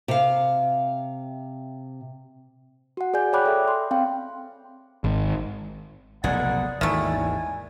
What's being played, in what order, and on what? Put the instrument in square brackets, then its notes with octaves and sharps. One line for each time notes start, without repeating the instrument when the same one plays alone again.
[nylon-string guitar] C3 F5
[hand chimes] F#4 F#5
G#4 D5 G#5 G6
C#5 D5 G5 B5 D6 F#6
A4 E5
C6
C4 F5 G5
[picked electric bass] G#1
[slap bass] F1 B1 A#2 [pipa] G#4 [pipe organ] D5 [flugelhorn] F#5
[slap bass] G#1 D#2 E3 [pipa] D#3 A3 [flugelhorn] G#5